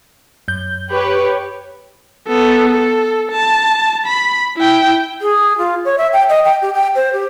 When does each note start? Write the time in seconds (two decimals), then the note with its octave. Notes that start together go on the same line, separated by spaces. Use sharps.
0.48 F#2 G6
0.91 G4 B4 C#5
2.28 B3 A4
2.69 A4
3.32 A5
4.07 B5
4.57 E4 G5
5.21 G#4
5.58 F4
5.85 C#5
5.98 E5
6.13 G5
6.29 D#5
6.44 G5
6.62 G4
6.74 G5
6.95 C5
7.13 G4